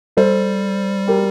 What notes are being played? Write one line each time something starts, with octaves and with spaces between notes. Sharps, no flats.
G3 A4 C5
G4 A#4